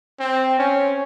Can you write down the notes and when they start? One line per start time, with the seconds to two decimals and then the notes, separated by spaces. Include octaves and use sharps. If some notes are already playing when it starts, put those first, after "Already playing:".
0.20 C4
0.59 C#4